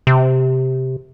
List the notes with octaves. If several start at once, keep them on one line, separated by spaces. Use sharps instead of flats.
C3